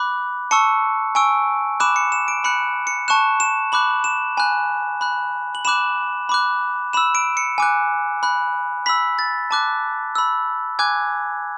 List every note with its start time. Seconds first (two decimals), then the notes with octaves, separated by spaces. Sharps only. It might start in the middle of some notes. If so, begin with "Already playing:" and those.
Already playing: B5 D6 F#6
0.51 A5 C#6 E6 C#7
1.15 G#5 C#6 E6 D7
1.80 B5 D6 F#6 E7
1.96 C#7
2.12 E7
2.28 D7
2.44 B5 F#6 C#7
2.87 C#7
3.08 A5 C#6 F#6 E7
3.40 E7
3.72 B5 D6 F#6 F#7
4.04 E7
4.37 G#5 B5 F#6
5.01 B5 F#6
5.55 F#7
5.65 B5 D6 F#6 E7
6.29 B5 D6 F#6
6.93 B5 E6 E7
7.15 D7
7.37 C#7
7.58 G#5 D6 F#6
8.23 B5 F#6
8.86 B5 E6 B6
9.19 A6
9.51 A5 D6 F#6
10.15 B5 E6
10.79 G#5 D6 F#6 G#6